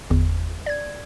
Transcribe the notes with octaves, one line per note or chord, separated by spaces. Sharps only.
G1 E2
D5 G#6